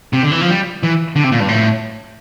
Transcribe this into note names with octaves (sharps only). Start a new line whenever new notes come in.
C3
D3
E3
F3
G3
E3
D3
C3
A#2
G2
A2